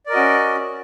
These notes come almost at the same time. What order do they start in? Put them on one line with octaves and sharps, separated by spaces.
D5 A#4 D#5 F#4 C#4